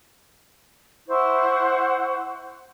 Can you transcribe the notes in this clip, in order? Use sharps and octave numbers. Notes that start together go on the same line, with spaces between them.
E4 C5 F#5 C#6